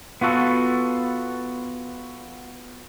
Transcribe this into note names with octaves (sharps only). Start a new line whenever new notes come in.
B3 F4 F#4 A4